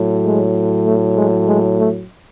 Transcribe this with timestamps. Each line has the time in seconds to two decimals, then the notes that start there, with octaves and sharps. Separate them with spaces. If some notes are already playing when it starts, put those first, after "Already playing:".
Already playing: A2 F#3
0.22 G#3
0.84 A3
1.16 G#3
1.47 G#3
1.79 A3